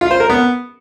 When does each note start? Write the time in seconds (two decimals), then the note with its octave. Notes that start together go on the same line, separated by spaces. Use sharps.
0.01 F4
0.11 C5
0.20 A#4
0.30 B3